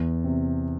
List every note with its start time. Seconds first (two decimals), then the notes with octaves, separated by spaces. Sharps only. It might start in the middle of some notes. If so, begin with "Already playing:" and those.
Already playing: E2
0.24 C3